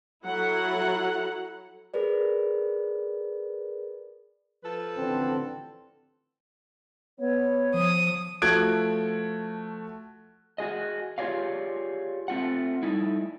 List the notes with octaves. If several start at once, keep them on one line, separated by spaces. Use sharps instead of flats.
F#3 E4 A4 F#5 A#5
G#4 A#4 B4 D5
F3 A4 B4
A1 D3 C4
B3 C#5
F3 D#6
F3 A3 F#4 F#6 G#6 D7
F#4 G#4 D#5
F4 G4 G#4 C#5 D5 F5
A3 C4 F4 F#5
G3 A3 D#4 E4